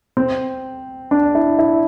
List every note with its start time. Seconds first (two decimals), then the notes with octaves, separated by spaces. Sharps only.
0.17 C4
1.11 D4
1.35 E4
1.59 E4